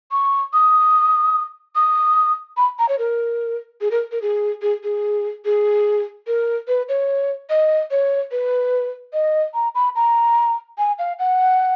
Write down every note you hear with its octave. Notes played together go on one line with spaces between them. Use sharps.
C#6
D#6
D#6
B5
A#5
C#5
A#4
G#4
A#4
A#4
G#4
G#4
G#4
G#4
A#4
B4
C#5
D#5
C#5
B4
D#5
A#5
B5
A#5
G#5
F5
F#5